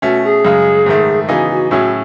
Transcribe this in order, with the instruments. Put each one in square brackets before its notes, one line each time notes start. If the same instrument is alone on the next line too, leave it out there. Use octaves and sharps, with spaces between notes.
[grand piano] B2 A3 C#4 [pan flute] F#4
[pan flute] G#4
[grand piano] F#2 C#3 G#3
G#2 D#3 A3
[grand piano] C#3 E3 B3 D#4 G#4 [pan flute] F#4
[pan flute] F#4
[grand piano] A2 F#3 C#4 E4 G#4 [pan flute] F#4